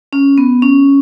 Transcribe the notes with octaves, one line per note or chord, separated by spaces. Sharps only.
C#4
B3
C#4